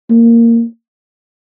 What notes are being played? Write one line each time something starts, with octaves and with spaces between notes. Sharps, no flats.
A#3